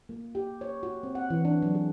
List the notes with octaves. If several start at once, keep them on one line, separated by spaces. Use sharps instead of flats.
A#3
G4
C#5
F#4
C4
F#5
E3
D4
F#3
G#4